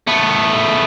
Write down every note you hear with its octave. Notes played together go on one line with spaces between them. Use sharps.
A3 B3